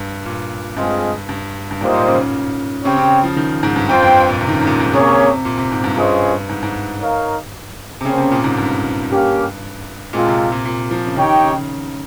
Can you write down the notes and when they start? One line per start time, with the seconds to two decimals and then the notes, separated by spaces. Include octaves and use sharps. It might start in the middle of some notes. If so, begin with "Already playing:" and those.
Already playing: G2
0.26 A#2
0.77 G2 G#3 C4 F4 G#4 D#5
1.29 G2
1.71 G2
1.81 G#2 G3 A#3 F4 C5 D#5
1.94 A#2
2.08 C#3
2.19 C#3
2.85 C#3 C4 G4 C#5 G5
2.97 C#3
3.24 F3
3.36 D#3
3.63 G#2
3.76 G2
3.89 F2 F4 C5 G5
4.03 G2
4.29 A#2
4.41 C3
4.48 D#3
4.55 C#3
4.61 G#2
4.67 A#2
4.80 G#2
4.93 C3 A#3 C#4 G#4 C#5
5.18 C3
5.45 A#2
5.58 C3
5.72 G#2
5.84 G2
5.97 G2 C#4 F4 G#4 C5 D#5
6.49 G#2
6.63 G#2
7.01 D#4 A#4 C#5 F5
8.01 C3
8.05 C#3 A#3 C#4 G#4 C5 G5
8.18 C3
8.31 A#2
8.44 G#2
8.57 G2
9.09 A#3 C#4 G4 A#4 F5
10.13 A#2 G#3 C4 F4
10.27 C3
10.52 A#2
10.65 A#2
10.91 F3
11.07 C#3
11.16 D#3 D#4 G4 C#5 G5
11.44 C#3